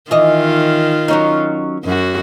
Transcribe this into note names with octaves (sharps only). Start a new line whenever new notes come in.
D#3 E3 F4 D#5
F#3 C#4 D#4
F#2 F#4